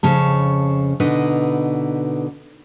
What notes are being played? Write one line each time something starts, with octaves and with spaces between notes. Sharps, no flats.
F2 C#3 C#5 A5
B2 D3 D#4 B4 D#5